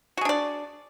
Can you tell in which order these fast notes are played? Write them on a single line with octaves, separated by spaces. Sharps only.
F#4 G#4 D4 D5